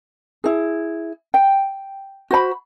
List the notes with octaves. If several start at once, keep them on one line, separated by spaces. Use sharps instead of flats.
E4 G#4
G5
F#4 C5 B5